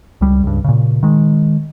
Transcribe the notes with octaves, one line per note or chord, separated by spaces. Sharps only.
C#2 G3
C#2 G2
A#2 C#3
D#3 G#3